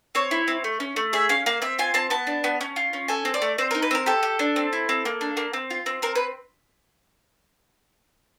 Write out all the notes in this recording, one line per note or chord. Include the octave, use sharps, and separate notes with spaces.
C4 C#5
E4
C4
A3
C#4
A3
G#4 E5
C#4 F5
A#3 F5
C4 E5
F4 G#5
C4 A5
B3 A5
D4
B3
C#4
F4
C#4
A4 G#5
C4
D5
A3
C4 C5
A#4
D#4
B4
C4 A#4
G4 A4
G4
D4
C4
E4
C4
A#3
D4
A#3
C4
F4
C4
C4 A#4
B4